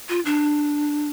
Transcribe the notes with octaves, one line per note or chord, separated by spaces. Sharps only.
F4
D4